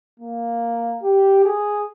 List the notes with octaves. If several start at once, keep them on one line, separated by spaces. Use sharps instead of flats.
A#3
G4
G#4